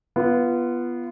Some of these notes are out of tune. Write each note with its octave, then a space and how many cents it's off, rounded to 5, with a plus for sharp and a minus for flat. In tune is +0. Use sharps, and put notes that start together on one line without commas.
B3 -10 F4 -25